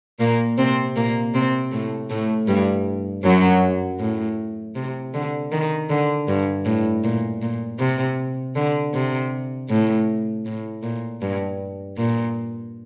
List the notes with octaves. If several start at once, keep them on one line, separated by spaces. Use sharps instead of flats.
A#2 A#3
C3 C4
A#2 A#3
C3 C4
A2 A3
A2 A3
G2 G3
F#2 F#3
A2
C3
D3
D#3
D3
G2
A2
A#2
A#2
C3
D3
C3
A2
A2
A#2
G2
A#2